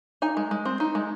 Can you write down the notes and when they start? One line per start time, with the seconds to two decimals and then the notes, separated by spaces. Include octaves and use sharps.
0.22 D#4 G#5
0.37 G#3
0.51 G#3
0.65 C4
0.80 D#4
0.95 G#3